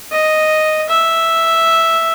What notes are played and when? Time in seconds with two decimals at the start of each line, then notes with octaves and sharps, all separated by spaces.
0.12 D#5
0.89 E5